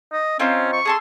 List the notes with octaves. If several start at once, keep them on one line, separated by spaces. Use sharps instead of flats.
D#5
C4 C#4 D#4 F4
C#6
G#4 A4 C6